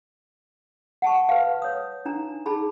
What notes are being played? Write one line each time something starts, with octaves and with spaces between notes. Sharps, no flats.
F#5 A5 C#6
B4 F5
C#5 D#6
D4 D#4 A#5
D#4 G#4 A5 B5